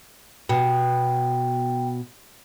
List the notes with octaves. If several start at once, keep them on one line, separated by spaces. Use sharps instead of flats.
B2 G5